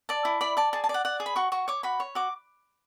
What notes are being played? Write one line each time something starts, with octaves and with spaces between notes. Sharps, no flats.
D5 A5
E4
D5 B5
D5 A5
G#4 A5
A5
D5
F#5
D5 F#5
G#4
B5
F#4 C#6
F#4 C#6
C#5 D6
F#4 B5
C#5
F#4 D6